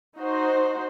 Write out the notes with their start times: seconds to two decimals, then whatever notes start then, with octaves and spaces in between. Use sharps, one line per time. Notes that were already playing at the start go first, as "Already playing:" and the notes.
0.17 D#4 F#4 C5